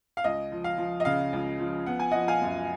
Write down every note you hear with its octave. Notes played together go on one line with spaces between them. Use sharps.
F5
C#2 D#5
F3
F5
F3
D#5
C#3 F5
C#2
F3
B3 F#5
G#5
F3 D#5 F#5
F5 G#5
F#2